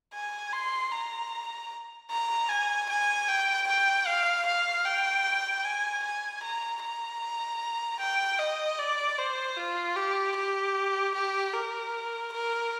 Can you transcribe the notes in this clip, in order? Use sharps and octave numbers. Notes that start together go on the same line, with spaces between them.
G#5
C6
A#5
A#5
G#5
G#5
G5
G5
F5
F5
G5
G#5
G#5
A#5
A#5
G5
D#5
D5
C5
F4
G4
G4
G4
A#4
A#4